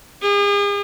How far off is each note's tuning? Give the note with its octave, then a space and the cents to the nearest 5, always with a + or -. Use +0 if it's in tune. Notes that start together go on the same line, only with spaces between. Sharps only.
G#4 -40